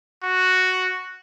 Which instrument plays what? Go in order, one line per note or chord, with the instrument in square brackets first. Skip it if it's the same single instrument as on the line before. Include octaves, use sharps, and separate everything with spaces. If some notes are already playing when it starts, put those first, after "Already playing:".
[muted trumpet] F#4